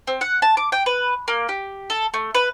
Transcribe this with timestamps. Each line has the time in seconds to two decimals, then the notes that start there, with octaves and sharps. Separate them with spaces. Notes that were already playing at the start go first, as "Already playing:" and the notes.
0.07 C4
0.21 F#5
0.42 A5
0.57 D6
0.72 G5
0.86 B4
1.28 A#3
1.49 G4
1.90 A4
2.14 A3
2.35 B4